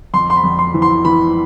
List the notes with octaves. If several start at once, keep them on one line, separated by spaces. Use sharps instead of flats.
F2 C6
C6
B5
F2
C6
E3
C6
E3 B5